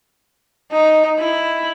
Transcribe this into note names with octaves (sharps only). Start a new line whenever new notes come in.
D#4
E4